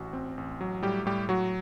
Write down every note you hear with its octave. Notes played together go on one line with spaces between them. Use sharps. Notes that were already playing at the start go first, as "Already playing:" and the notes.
Already playing: A1 F#4
C4
A1
F#3
A2 G3 G4
A2 G3 G4
F#3 F#4